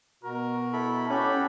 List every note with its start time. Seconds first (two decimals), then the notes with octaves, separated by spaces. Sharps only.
0.24 B2 F#4 A#4
0.73 E4 A4 B5
1.10 C#4 F#4 G4 A4 B5